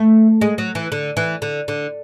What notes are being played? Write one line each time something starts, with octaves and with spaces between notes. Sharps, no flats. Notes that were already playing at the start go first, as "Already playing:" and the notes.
Already playing: A3
G#3
F#3
E3
D3
E3
D3
D3